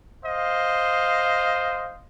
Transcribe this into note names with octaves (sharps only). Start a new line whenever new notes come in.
C5 D#5 F5